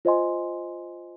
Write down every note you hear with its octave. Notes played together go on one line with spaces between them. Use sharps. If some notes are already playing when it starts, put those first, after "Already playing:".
F4 C5 D#5 G#5 C6